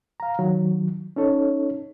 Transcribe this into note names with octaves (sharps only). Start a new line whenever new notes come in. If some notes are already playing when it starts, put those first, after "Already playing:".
F5 A#5
D#3 F#3
C#4 D#4 A4 C#5